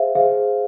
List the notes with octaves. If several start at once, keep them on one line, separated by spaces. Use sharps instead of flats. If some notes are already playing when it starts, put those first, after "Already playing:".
Already playing: G#4 C5 E5 F5
G#4 C5 F5